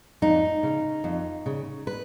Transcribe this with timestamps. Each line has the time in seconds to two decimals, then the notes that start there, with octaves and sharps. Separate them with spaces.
0.22 F2 D#4
0.63 C#3
1.04 F2
1.46 C#3
1.87 B4